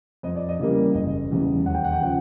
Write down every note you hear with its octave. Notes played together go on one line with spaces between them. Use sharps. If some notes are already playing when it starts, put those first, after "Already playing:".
F2 D#5
D5
D#5
C#3 E3 G3 A#3
F#1 D#5
E2 C#3 E3 G3
D#2 F#5
G5
F#5
G5
C#3 F3 F#5